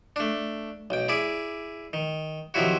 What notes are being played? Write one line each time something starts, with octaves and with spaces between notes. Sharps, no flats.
A3 D4
B1 G5
E4 G#4 D5
D#3
C3 D#3 F3 F#3 E4 F#4